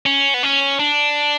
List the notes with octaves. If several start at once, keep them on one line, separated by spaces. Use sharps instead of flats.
C#4
B3
C#4
D4